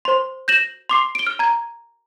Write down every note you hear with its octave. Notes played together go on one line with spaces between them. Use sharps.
C5 C6
G6 A#6 E7 F#7
C6 D6 C7
D7 G7
F6
A#5 G#6